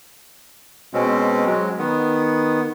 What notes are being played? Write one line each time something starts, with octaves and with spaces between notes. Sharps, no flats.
B2 G#3 C4 C#4
F#3 G#3
D#3 B3